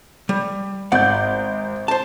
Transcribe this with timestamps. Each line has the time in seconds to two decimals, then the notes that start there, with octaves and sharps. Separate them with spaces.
0.29 G3
0.92 G#1 D5 F#5 G6
1.88 C5 A5